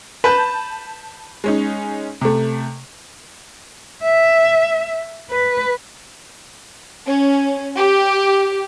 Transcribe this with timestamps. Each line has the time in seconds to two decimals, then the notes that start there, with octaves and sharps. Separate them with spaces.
0.24 B4 A5 G6
1.44 G#3 C#4 D#4
2.21 C3 A3
4.04 E5
5.32 B4
7.06 C#4
7.76 G4